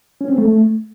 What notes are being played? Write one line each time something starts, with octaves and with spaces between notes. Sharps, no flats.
C#4
C4
A3